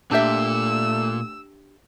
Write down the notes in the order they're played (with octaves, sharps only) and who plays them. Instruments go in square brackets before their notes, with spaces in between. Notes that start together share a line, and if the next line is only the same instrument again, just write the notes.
[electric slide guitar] A#2 [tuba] A3 [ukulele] D4 G4 E5 [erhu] E6